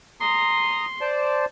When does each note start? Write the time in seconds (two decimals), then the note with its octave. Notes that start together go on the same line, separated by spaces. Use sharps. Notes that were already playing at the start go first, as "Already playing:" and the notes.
0.21 A#5 C6 D#6
1.01 C5 D5 A5